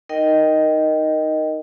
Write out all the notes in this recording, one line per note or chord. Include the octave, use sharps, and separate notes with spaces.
D#4 A#4 D#5 G5